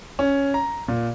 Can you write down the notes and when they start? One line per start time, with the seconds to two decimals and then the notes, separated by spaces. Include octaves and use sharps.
0.19 C#4
0.54 A#5
0.88 A#2